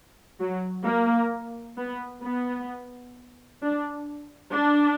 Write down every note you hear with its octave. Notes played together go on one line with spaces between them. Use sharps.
F#3
A#3
B3
B3
D4
D4